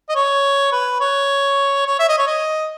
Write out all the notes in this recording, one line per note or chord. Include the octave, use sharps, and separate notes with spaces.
D#5
C#5
B4
C#5
C#5
E5
D#5
C#5
D#5